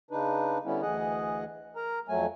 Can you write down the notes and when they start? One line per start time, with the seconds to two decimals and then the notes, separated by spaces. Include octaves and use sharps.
0.11 C#3 D4 D#4 B4
0.65 D3 G3 B3 C#4 E4
0.82 D2 E3 G#4 D#5 F#5
1.76 A#4 A#5
2.09 F2 F#3 A3 G#5